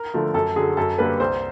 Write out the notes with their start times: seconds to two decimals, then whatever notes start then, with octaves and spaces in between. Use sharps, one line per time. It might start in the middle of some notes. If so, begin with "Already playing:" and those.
Already playing: A#4
0.14 D3 F3 A3
0.34 F#2 A4
0.56 D3 F#3 G#4
0.77 F#2 A4
0.98 D3 G3 A#3 D4 B4
1.20 C2 C5